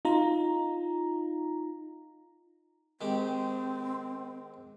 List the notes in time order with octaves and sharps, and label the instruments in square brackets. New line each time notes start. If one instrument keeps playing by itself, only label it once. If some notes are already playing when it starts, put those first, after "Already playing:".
[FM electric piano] D#4 F4 A#5
[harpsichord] D#3 G#3 G4 [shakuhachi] C4